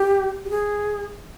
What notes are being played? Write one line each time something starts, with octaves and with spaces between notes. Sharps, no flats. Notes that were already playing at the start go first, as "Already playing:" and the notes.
Already playing: G4
G4
G#4